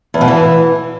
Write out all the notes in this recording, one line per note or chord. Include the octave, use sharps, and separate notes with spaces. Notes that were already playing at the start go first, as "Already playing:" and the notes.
E2
B2
E3